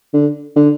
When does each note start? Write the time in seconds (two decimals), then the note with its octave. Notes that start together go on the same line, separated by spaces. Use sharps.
0.14 D3
0.56 D3